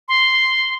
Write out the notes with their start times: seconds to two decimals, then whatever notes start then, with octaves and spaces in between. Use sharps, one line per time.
0.08 C6